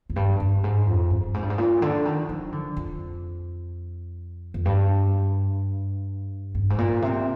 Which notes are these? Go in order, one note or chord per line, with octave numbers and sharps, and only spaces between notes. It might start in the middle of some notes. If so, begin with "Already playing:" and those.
F2
G2
G2
G#2
F2
G2
G#2
G2
G#2
A#2
D3
D#3
F3
D3
F2
F2
G2
G2
G#2
A#2
C3